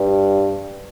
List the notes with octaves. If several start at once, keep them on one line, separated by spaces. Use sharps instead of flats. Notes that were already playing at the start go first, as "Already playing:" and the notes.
Already playing: G2